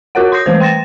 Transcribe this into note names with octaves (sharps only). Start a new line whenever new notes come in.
F4 F#4 A#4 C#5 F#5
C6 D#6 G6 A#6 C7
E3 A3 B4 C5
G5 C6 A6 A#6 E7